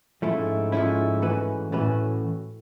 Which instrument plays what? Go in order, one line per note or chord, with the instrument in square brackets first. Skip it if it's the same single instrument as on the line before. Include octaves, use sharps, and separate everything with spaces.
[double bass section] G#2 [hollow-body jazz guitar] F3 A3 C#4 E4
[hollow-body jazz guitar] F3 A3 C#4 E4
E3 A3 C#4 F#4 B4
[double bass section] A2 [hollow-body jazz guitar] E3 A3 C#4 F#4 B4